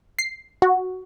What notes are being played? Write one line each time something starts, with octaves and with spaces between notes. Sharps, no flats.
C7
F#4